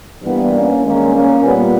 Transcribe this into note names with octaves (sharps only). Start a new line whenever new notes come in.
G2 E3 G3 A#3 B3
A#3 C#4
G2 D#3 G#3 A#3 C#4
A#3 C#4
A#2 G3 A#3 B3